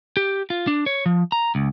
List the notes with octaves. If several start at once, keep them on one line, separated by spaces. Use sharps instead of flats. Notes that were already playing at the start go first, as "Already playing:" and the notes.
G4
F4
D4
C#5
F3
A#5
C#2